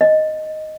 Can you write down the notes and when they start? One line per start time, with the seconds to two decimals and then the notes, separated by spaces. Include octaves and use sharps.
0.01 D#5